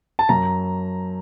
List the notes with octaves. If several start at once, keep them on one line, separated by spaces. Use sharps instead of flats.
A5
F#2 A#5